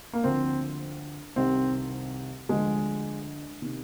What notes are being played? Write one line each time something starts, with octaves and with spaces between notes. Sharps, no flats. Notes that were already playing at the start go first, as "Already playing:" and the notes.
A#3
D2 D3 F3 C4
C2 C3 D#3 C4
D2 D3 F3 G#3
C3 D#3